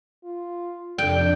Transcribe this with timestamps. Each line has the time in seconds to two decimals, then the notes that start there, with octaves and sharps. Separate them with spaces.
0.25 F4
0.98 F2 C3 D4 D5 G5